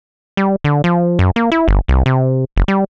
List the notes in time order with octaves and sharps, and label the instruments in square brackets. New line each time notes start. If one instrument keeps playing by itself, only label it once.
[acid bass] G3
D3
F3
F#2
A#3
E4
G1
C2
C3
F#1
G3